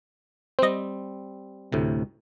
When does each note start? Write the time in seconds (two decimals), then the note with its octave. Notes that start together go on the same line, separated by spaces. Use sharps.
0.59 G3 C4 C5 D#5
1.72 D2 A2 C3